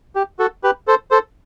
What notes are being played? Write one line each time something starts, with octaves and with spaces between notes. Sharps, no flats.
G4
F#4 A4
G4 B4
A4 C5
A4 C5